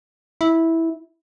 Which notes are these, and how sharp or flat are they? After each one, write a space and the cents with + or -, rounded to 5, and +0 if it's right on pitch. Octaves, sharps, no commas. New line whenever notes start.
E4 -10